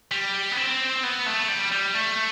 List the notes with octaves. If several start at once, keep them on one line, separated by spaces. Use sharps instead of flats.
G3
B3
C4
B3
A3
G3
G3
A3